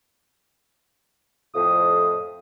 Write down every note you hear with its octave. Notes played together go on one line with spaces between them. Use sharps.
F2 A2 F3 D#6